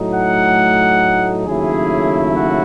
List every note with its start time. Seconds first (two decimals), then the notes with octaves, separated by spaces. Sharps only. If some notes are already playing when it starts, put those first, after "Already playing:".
Already playing: A2 F#3 A3 D#4
0.13 F#5
1.45 D#2 C#3 F#3 A3 E4 G#4
2.34 F#4